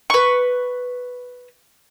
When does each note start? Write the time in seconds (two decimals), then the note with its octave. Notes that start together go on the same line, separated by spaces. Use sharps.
0.10 B4 C#6